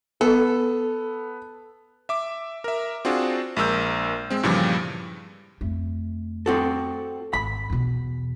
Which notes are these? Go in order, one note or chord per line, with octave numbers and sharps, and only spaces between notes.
B3 A4
E5 D6
A#4 E5
C4 D4 F4 F#4 G#4
A#1 G#3 A#4 E6 G6
G#3 C4
G2 A#2 C#3 E3 F3 G3
F2 A3
C4 F#4 A4
G#1 B5
E2 B2